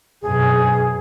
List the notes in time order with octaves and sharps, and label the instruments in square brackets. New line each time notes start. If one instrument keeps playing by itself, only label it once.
[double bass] F#2 B2 [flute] G#4